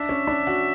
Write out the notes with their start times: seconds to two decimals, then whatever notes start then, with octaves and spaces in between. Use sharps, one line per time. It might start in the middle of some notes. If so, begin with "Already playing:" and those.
Already playing: D4 E5
0.09 C#4
0.27 D4
0.47 F#4